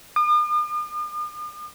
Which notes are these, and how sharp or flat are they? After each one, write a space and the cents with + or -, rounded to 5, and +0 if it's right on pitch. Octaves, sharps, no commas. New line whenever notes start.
D#6 -45